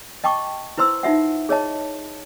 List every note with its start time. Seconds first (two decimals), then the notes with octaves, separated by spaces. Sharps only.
0.24 D#5 G5 A5 C#6 D6
0.78 E4 B4 C5 C6 E6
1.03 D#4 F4 E5 F#5
1.49 G#4 C#5 D#5 A5